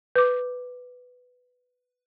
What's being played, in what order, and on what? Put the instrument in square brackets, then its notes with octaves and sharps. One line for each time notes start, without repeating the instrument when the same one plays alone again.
[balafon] B4 D6